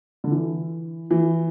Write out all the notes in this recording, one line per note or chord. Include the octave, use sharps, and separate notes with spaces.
D3
E3
E3